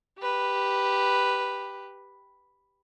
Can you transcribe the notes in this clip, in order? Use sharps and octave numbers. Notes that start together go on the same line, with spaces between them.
G4 B4